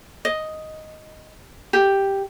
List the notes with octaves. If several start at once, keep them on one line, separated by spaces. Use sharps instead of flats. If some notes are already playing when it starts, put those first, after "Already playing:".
D#5
G4